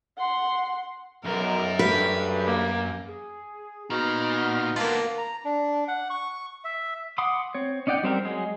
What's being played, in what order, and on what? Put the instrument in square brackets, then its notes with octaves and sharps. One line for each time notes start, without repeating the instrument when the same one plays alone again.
[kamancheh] F#5 C6
[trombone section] B1 [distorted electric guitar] F#2 [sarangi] A#4
[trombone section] G2 A3 [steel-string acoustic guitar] B4
[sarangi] A#3
[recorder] G#4
[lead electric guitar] A#2 [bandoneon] B3 D#4 F#4 [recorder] F6
[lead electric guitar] D3 B3 [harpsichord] A#3 F4 [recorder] A5
[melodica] A#5
D4
F#5
C#6
E5
[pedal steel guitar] F#5 B5 C6 D6 D#6
C4 C#5
C#4 D#4 D5 F#5 G5
G3 C4 G4 A#4
F#3 G#3 G#4